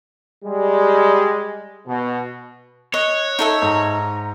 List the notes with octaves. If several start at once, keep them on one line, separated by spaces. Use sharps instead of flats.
G3 G#3
B2
C#5 D#5 F#6
D#4 A4 E5
G#2 A#5